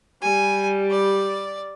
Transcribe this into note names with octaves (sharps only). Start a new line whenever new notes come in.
G3 G#5
D5